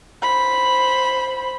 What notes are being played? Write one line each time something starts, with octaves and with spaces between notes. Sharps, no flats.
C5 B5